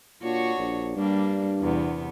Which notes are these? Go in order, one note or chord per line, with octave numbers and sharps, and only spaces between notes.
A#2 D4 F#4 C#5
A#1
G2 G3 A#3 D4
E2 C3 B3